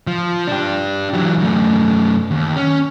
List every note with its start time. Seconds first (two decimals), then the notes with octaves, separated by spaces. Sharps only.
0.07 F3
0.48 D4 G4
1.13 E3 F#3
1.38 F#2 A3
2.31 D#2
2.56 C#4